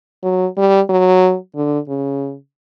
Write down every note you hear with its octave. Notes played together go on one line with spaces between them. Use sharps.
F#3
G3
F#3
D3
C#3